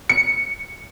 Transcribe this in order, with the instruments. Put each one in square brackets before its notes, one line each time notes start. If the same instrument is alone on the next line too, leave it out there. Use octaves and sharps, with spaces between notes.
[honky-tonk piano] C#7